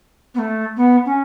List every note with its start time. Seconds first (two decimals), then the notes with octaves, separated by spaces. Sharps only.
0.34 B3
0.38 A3
0.76 B3
1.05 C#4